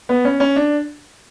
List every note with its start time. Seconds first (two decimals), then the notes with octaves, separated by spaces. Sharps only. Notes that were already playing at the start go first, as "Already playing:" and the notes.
0.09 B3
0.25 C#4
0.40 C#4
0.56 D4